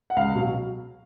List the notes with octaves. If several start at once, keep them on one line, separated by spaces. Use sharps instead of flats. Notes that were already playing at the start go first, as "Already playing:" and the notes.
F#5
C#2 F5
B2 F#3